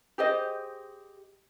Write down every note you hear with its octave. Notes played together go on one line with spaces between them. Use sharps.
G4 G#4 C5 D#5